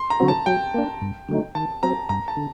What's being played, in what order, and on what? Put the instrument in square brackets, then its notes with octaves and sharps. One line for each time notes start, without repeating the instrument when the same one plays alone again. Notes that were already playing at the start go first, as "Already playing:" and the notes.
Already playing: [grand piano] C6
A#5
[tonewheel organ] D3 F#3 C4 F#4
[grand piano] A5
[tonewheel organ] F#3 [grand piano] G5
[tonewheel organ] A#3 D4
G2
D3 F#3 A3 D#4
[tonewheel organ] D#3 [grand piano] A5
[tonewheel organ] F#3 C4 [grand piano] A#5
[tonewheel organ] G2 [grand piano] A#5
[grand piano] A5
[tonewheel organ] D3